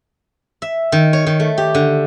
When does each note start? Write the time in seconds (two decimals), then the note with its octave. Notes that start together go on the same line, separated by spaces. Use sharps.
0.62 E5
0.92 D#3
1.13 C#5
1.27 D#3
1.40 A3
1.58 G4
1.75 D3